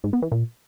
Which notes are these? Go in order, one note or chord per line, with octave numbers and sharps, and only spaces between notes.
G#2
B3
E3
A#2